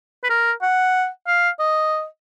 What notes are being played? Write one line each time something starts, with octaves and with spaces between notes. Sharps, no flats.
B4
A#4
F#5
F5
D#5